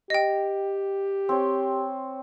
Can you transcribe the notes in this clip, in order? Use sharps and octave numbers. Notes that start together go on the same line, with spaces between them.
G4 D#5 G5
C4 C#5